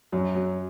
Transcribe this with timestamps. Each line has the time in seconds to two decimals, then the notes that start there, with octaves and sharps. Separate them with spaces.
0.12 F#2 F#3
0.35 F#3